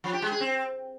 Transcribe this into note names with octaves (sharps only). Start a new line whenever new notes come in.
F3
G4
G#3
G#4
C4